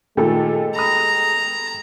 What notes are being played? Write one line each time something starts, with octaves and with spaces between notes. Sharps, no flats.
A#2 D#3 G#3 A3 G4 A4
A#5 B5 D#6